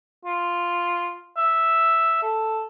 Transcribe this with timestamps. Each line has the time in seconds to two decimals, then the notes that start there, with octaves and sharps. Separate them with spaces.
0.25 F4
1.37 E5
2.22 A4